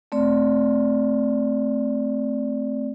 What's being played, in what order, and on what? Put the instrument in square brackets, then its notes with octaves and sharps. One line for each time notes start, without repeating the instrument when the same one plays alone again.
[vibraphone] A3 C4 D5